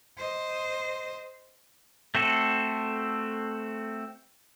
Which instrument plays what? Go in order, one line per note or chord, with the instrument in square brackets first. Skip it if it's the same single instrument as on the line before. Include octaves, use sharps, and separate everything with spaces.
[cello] C5 D#5
[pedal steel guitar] A3 C4 F#4 A4